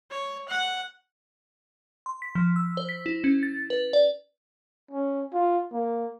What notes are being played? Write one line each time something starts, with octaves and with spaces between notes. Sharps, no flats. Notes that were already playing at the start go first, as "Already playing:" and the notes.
C#5
F#5
C6
B6
F3
E6
C5
B6
E4
C#4
A6
B4
D5
C#4
F4
A#3